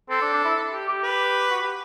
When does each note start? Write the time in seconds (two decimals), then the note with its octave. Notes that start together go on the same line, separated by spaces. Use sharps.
0.10 C4 A4
0.22 D4
0.33 D4
0.45 E4
0.73 G4
0.88 G4
1.03 B4
1.51 F#4
1.62 G4